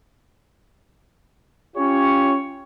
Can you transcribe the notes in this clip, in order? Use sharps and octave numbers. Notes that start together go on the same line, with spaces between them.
C#4 F4 G4 C#5